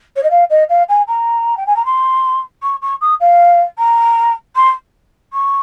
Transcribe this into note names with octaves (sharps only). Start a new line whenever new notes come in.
C#5
D#5
F5
D#5
F5
G#5
A#5
G5
G#5
A#5
C6
C#6
C#6
D#6
F5
A#5
C6
C#6